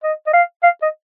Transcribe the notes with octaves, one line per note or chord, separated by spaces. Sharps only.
D#5
D#5
F5
F5
D#5